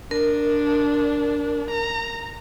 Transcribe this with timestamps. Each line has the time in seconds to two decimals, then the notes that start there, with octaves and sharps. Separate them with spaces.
0.11 D4 A#4
1.71 A#5